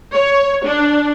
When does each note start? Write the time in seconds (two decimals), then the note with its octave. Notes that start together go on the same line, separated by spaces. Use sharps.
0.14 C#5
0.65 D4